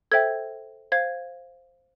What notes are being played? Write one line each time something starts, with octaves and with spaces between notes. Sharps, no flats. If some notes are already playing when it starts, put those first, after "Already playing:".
A4 C5 E5 G5 G#6
C5 F5 G#6